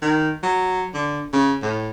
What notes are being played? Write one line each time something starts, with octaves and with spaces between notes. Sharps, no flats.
D#3
F#3
D3
C#3
A2